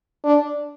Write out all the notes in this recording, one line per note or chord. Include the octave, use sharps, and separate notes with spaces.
D4